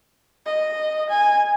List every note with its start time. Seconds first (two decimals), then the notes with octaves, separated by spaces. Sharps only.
0.46 D#5
1.10 G#5